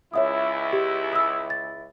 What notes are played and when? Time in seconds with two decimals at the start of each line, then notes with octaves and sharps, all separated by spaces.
0.14 C#2 E4 C#5 E5 D#6
0.73 G4
1.13 D#6 E6
1.50 A6